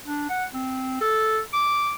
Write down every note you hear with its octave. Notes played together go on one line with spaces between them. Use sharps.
D4
F#5
C4
A4
D6